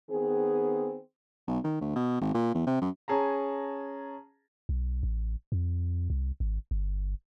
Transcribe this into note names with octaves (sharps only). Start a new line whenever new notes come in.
D#3 B3 C4 G#4
B1
D#3
D2
B2
G#1
A#2
E2
C3
F#2
C#4 G#4 A5 A#5
B1
A1
F2
C2
G#1
G1